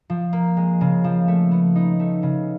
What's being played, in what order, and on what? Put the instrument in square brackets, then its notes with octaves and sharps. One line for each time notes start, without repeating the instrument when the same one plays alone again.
[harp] F3
A#3
G#3
C#3
F3
A3
B3
D#4
A3
C#3